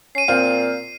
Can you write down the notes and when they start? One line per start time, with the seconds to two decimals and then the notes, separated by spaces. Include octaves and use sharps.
0.15 C#4 C7 D#7
0.28 A#2 C4 F5